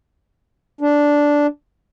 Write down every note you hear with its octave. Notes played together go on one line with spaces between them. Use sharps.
D4